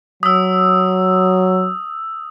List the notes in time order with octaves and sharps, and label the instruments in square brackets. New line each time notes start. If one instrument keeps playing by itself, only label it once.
[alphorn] F#3 [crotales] D#6 E6